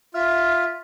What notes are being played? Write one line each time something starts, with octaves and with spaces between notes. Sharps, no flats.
F4 E5 F6